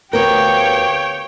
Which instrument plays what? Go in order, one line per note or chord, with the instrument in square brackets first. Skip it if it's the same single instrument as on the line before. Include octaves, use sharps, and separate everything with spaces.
[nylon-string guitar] D2 B3 A#4 [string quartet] G4 F5 [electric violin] C#5 G5